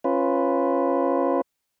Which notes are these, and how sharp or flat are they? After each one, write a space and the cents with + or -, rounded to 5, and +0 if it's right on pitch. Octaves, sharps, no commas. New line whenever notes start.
C#4 -20 F4 -10 B4 +0